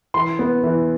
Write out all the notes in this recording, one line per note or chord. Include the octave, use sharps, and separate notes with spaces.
E3 C6
B3
E3